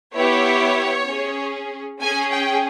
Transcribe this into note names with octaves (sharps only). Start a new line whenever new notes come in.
B3 E4 G4 C#5
C#4 G#4
C#4 G#4 G#5
G5